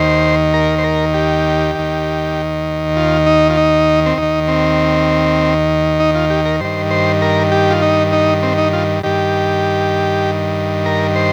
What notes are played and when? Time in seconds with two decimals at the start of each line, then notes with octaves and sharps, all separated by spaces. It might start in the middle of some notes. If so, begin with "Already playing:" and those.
Already playing: D#2 D#3 C5
0.54 A#4
0.79 C5
0.84 A#4
1.14 G4
1.75 D#2 D#3
2.96 F4
3.26 D#4
3.50 F4
3.57 D#4
4.06 C4
4.18 D#2 D#3 D#4
4.48 C4
6.00 D#4
6.15 F4
6.30 G4
6.46 A#4
6.60 G2 D#3 C5
6.91 C5
7.22 A#4
7.52 G4
7.70 F4
7.82 D#4
8.13 D#4
8.43 C4
8.58 D#4
8.73 F4
9.03 G2 D#3 G4
10.86 A#4
11.16 C5